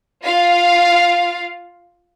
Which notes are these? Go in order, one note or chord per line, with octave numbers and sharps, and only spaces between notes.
F4 F5